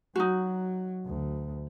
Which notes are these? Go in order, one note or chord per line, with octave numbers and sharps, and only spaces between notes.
F#3 D#4 F#4
D2